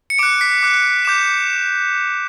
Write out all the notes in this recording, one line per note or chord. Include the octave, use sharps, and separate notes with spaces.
C#7
D6 F#6 D7
B6
D6 F#6
D6 G6 E7